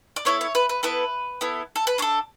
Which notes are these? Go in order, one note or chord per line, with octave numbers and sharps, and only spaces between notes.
D5
B3 E4 A4 C#5
C#5
B4
B4
B3 E4 A4 B4
B3 E4 A4
A4
B4
D4 A4 C#5